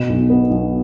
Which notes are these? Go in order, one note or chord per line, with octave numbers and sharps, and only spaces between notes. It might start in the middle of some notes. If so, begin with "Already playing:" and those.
Already playing: B2 E7
B1
B3
B1